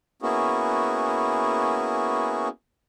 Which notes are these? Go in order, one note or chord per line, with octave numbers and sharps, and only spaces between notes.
A#3 B3 C#4 E4 F#4 G#4